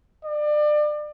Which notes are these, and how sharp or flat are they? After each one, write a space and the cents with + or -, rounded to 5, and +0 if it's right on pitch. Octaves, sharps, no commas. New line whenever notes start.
D5 +30